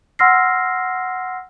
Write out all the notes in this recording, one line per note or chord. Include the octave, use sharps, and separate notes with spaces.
F#5 C6 E6 F6 A#6 C7